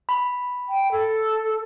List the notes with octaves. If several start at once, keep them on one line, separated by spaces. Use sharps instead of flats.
B5
G5
A4